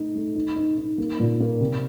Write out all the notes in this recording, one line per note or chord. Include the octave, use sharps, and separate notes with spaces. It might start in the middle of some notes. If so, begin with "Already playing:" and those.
Already playing: A3 D#4
A3
D#4
D#4
D#4
A#3
A#2
A#3
C3